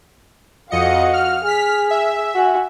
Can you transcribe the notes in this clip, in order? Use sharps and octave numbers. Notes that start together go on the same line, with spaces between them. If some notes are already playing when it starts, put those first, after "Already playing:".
F2 F#4 D#5 F5 C#7
F6
G#4 F6 B6
E5
F#4 G#5